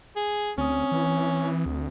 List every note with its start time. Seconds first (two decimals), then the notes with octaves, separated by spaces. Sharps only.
0.16 G#4
0.58 D2 C4 C#4 D#6
0.92 E3
1.66 D2